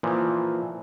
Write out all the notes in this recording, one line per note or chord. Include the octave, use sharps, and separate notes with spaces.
A#2 E3 F3